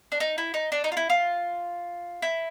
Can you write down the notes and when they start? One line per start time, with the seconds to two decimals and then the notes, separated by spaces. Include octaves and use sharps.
0.12 D4
0.20 D#4
0.38 E4
0.54 D#4
0.72 D4
0.84 D#4
0.92 F4
0.97 E4
1.10 F4
2.22 E4